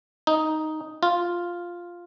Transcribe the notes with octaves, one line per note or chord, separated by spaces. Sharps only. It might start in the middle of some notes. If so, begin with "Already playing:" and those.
D#4
F4